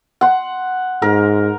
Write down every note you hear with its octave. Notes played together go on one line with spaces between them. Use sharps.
F#5 C6
G#2 A#4